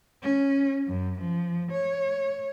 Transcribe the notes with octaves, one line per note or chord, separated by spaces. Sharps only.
C#4
F#2
F3
C#5